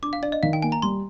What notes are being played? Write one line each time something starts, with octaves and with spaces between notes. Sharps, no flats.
D4 D6
F5
D4 D5
D#5
D#3 F5
G5
A#3 G#5
A#5
G3 C6